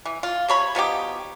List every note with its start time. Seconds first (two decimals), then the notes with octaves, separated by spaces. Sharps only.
0.06 E3
0.23 F4
0.48 C3 C#5 B5
0.75 F3 B3 D#4 G4